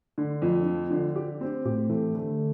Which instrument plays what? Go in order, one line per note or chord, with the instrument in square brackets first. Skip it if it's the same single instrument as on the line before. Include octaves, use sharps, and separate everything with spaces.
[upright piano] D3
F2
F3
D3
G4
C4
[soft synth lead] A2 [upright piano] G4
[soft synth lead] E3 [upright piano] A3
[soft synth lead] D3 [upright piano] A3